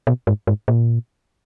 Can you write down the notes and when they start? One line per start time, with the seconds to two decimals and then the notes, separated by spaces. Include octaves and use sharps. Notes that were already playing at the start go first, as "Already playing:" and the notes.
0.07 B2
0.27 G#2
0.47 G#2
0.68 A#2